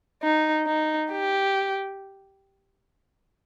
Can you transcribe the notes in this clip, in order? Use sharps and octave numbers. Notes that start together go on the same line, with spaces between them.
D#4
D#4
G4